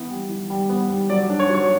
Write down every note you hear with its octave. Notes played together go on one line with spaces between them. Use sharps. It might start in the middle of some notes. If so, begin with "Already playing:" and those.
Already playing: E3 B3
G3
E3
G3
B3
G3
F#3 D5
D4
C#5
F#3
C#5